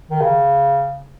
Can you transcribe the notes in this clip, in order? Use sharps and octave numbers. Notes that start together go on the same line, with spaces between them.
D#3
C#3